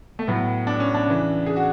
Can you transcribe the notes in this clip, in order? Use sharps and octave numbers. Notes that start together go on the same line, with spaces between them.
A3
A2 F#3 B3
D4
C#4
D4
C#3 E3
G#4
F#4